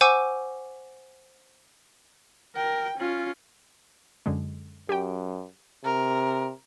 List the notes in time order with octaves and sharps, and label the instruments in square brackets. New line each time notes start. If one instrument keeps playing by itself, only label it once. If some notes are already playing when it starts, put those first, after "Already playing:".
[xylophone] C5 F#5 G#5 C#6 D6 E6
[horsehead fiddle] A#4 G5
C#4 F4
[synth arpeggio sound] F#2 D3 G#3
[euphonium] F#2 [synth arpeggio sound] G4 G5
[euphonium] C3 [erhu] A#4